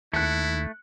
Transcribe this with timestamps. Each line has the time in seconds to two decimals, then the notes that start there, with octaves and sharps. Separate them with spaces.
0.14 D#2 A3 E4 F#6 C#7